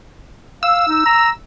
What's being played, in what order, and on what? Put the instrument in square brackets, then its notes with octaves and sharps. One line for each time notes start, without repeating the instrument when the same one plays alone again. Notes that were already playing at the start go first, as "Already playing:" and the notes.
[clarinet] F5 [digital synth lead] E6
[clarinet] D#4
A#5